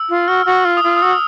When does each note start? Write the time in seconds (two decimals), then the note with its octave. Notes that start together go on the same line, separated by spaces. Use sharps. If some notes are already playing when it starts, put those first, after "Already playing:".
Already playing: E6
0.09 F4
0.28 F#4 F6
0.46 F#4
0.53 E6
0.65 F4
0.77 D#6
0.84 F4
0.97 D#6
1.02 F#4 E6